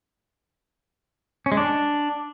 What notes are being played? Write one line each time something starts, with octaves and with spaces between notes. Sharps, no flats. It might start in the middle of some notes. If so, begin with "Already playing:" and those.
C#4
G#3
D4